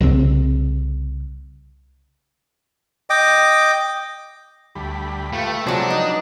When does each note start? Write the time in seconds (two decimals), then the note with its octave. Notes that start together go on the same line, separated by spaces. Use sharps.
0.01 C2 C#3 F3 C4
3.10 D#5 G5 D6
4.75 D2 G3 B5
5.33 A3 F4 G4 B4
5.67 C3 F3 F#3 G#3 D4
5.90 D#4 B4 D#5